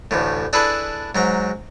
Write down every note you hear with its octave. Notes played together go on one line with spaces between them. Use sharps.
A1 D2 A2
D4 E4 G#4 A4 B4
G#2 F#3 A#5